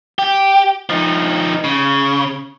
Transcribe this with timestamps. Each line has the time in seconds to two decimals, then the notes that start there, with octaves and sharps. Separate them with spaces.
0.19 G4
0.89 F3 D#4
1.64 C#3